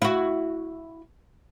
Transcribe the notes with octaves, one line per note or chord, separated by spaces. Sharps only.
E4 F#4